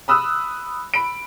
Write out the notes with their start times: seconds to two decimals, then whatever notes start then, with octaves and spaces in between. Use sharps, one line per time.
0.08 B5 D#6 E6 F#6
0.94 B5 D7